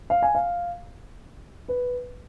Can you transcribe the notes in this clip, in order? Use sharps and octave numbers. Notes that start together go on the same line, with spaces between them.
F5
G#5
F5
B4